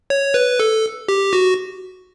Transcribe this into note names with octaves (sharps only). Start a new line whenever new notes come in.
C#5
B4
A4
G4
F#4